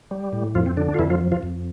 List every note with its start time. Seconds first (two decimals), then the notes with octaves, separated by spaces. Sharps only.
0.11 G3
0.33 A2
0.55 F2 F3 F4
0.66 C4
0.77 D3 D4
0.88 D4
0.94 F4
0.99 F2 E3 E4
1.10 F3 F4
1.21 F3
1.32 F3 F4
1.43 F2